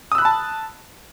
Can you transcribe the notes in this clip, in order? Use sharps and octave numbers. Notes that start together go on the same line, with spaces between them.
A5 B5 D#6 E6 F#6